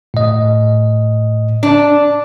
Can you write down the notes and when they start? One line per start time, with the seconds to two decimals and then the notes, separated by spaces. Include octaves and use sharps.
0.14 A2 D#5
1.63 D4